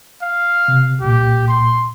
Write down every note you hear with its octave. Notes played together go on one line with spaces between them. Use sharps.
F5
C3
C2 A#2 G4
C6